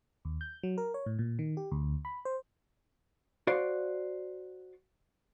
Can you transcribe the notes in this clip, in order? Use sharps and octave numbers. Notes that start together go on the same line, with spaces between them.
D#2
G6
F#3
A#4
C#5
A2
A#2
D#3
G4
D2
B5
C5
F#4 C5 D5 F5